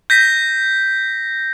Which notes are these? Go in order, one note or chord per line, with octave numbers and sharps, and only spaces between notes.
G6 A#6 B6